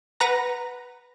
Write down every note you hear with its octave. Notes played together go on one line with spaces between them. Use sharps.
B4 F#5 A#5 A#6